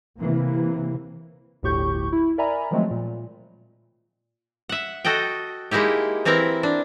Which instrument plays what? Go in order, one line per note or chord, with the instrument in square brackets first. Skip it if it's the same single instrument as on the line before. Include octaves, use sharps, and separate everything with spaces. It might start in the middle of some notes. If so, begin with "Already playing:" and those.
[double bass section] C3 E3 A#3
[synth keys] G1 D2 A2 G4 C#6 G6
E4
A#4 D5 E5 G#5 A#5 B5
D#3 F3 F#3 G#3 A3 C4
A#2
[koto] E5 F#5
F#4 A4 D#5 F#5 G5
G#3 A#3 D#4 E4 G4
E3 C4 E4 A#4 A#5
D4